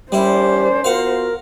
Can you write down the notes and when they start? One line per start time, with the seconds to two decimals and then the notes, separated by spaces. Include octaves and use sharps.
0.12 G3 C#4 E4 G4 A#4 C5 D5
0.84 B3 F4 F#4 A#4 F5 F#5